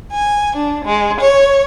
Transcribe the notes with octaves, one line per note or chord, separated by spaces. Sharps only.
G#5
D4
G#3
C#5